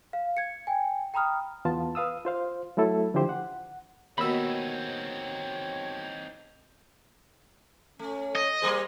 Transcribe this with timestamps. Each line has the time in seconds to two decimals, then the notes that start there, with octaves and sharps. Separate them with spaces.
0.13 F5
0.37 G#6 C#7
0.67 G5 G#5
1.14 G5 A#5 B5 D#6 F6
1.65 E2 B3 F4 A5
1.95 B4 F5 D#6 E6
2.25 F4 C5 F5
2.77 F#3 A3 E4 A4
3.14 D3 F3 E4 G4 C5
3.29 F#5
4.18 D#2 B2 C4 D#4 C#5 B5 E6
7.99 A3 C#4
8.36 D#5
8.62 G3 A#3 G#4 C5